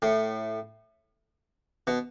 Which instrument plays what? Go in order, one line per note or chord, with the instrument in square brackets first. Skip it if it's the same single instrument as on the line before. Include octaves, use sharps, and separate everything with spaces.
[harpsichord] A2
B2